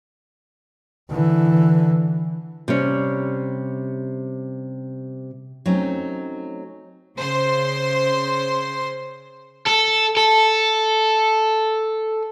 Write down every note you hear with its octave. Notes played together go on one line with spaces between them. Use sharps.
D3 E3
C3 G3 C#4
F#3 A3 C4 C#4 D#4
C#3 C5 C6
A4
A4